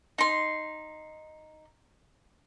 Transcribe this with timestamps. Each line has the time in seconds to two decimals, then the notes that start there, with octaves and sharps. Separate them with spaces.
0.18 D#4 C6